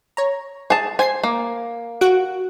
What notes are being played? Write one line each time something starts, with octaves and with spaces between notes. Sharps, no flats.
C#5 A#5
G#4 A5
C5 G#5 G#6 C7
A#3
F#4 F#6 D7